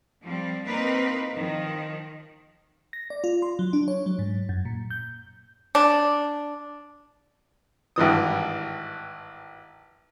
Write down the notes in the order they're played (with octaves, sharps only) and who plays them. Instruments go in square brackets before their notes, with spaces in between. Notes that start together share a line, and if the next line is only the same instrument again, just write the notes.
[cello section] F3 G3 C4
A#3 C4 D#4 A#4 B4
D#3 F3
[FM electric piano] A#6
D5
F4
C6
F#3
D4
C#5
F#3
G#2
F#2
A#2
G6
[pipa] D4
[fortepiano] G#1 G2 E3 D#6